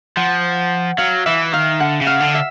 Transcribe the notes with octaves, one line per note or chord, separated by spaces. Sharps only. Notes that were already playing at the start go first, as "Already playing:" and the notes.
F3 F#5
F#3 F5
E3 E5
D#3 F5
D3 F#5
C#3
F5
D3
E5